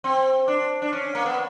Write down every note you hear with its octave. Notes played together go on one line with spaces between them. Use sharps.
C4
D4
D4
C#4
A#3
B3